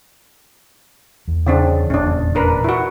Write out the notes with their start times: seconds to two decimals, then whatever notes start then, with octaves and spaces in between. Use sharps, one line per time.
1.28 E2
1.46 C#3 C4 D4
1.90 F1 E2 A#2 C#4 D4
2.35 D4 A#4 B4
2.64 E4 F#4